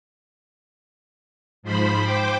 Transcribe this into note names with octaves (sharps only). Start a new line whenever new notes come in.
G#2 F3 C5 B5
C5 G5 D6